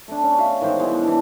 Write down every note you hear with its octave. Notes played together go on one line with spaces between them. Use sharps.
A3 D4
C#4
E5 F5
D#3 E3 G#3 C5
B2 G3 G#3 E4
E3 D4